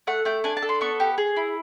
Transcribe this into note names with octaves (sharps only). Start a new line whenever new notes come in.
A3 F#5
A3 G5
D4 G#5
A5
A4
C6
B3 C#6
G4
G#4
E4